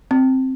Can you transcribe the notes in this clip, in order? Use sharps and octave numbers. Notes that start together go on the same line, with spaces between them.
C4